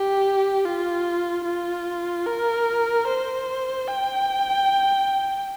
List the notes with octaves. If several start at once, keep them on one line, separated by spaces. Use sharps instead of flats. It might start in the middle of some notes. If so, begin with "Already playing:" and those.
Already playing: G4
F4
F4
A#4
C5
G5